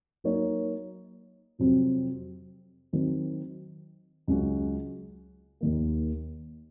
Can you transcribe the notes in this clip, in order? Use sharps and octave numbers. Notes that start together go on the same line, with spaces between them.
F#3 A#3 D#4 A#4 C#5
F2 C3 F#3 C4
D#3 F#3 C4
C#2 C#3 F#3 C#4 F#4
D#2 D#3 A#3